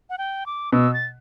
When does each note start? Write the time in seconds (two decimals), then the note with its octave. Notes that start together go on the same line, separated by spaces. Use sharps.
0.10 F#5
0.18 G5
0.46 D6
0.72 B2 E6
0.94 A6